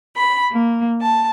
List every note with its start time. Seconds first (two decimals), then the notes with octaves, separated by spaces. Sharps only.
0.16 B5
0.52 A#3
1.00 A5